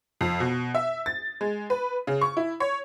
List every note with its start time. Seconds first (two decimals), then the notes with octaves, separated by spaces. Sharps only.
0.21 F2
0.40 B2
0.75 E5
1.06 A6
1.41 G#3
1.70 B4
2.07 C#3
2.21 C#6
2.37 E4
2.60 C#5